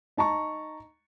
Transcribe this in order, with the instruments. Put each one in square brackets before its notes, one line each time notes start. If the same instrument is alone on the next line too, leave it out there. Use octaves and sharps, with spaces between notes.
[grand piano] D#4 A5 A#5 C#6